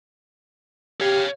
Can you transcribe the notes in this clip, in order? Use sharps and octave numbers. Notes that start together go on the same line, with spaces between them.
G4 C#5 F5